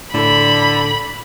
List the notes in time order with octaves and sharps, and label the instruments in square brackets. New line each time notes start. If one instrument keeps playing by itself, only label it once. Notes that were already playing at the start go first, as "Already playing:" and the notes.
[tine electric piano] A2 A4 [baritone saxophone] D3 [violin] B5